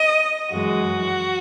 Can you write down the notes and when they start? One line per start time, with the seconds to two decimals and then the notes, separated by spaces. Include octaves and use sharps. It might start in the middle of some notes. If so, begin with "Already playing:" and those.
Already playing: D#5
0.51 F#2 E3 G#3 F#4